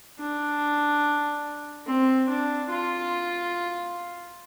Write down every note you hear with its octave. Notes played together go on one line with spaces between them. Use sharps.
D4
C4
D4
F4